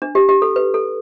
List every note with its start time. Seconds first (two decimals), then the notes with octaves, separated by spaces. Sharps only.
0.02 D4
0.15 G4
0.29 G4
0.42 A4
0.56 B4
0.74 A4